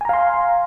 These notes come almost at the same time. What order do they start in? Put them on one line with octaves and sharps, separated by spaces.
G#5 A#5 F5 C6